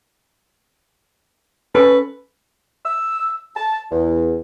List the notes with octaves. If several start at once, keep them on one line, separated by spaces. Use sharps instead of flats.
C#4 A4 B4
E6
A5
E2